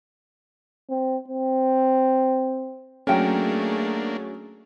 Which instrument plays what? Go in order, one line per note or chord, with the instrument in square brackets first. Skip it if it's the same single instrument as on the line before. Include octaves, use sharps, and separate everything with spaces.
[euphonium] C4
C4
[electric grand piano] F#3 C#4 [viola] A3 G#4 [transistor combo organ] A#3 D4 [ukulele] A#4 G5